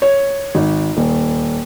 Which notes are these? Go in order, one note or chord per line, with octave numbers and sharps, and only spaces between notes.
C#5
G#1
D#1